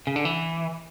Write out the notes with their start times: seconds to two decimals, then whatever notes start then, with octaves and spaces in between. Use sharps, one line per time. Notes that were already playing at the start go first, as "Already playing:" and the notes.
0.07 C#3
0.16 D3
0.25 E3